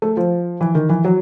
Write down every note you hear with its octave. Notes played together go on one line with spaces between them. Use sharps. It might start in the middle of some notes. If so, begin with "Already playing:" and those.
A3
F3
E3
D#3
E3
F#3